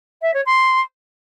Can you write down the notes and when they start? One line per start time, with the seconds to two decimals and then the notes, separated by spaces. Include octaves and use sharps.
0.22 E5
0.34 C#5
0.46 C6